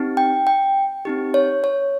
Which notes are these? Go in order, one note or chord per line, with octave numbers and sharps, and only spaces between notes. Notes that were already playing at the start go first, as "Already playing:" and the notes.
Already playing: C4 D#4 G4
G5
G5
C4 D#4 G4
C#5
C#5